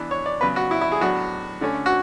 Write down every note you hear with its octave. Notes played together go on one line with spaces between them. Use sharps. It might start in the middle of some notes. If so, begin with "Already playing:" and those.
Already playing: E3 B3 D4
C#5
D5
C#3 F#3 B3 B4
F#4
E4
E4
G#4
A2 F#3 B3 D4 F#4
D3 A3 C#4
F#4